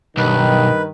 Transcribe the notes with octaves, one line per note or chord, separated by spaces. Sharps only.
B1 G2 D#3 B4